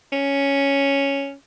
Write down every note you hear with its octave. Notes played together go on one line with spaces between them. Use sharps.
C#4